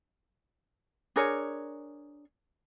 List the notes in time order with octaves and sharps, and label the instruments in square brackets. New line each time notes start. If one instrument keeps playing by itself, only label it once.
[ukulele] D4 G#4 A#4 C#5